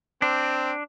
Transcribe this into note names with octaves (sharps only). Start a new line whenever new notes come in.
C4 D4